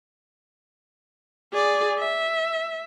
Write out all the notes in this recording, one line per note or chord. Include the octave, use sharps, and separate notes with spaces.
G#4 D5
E5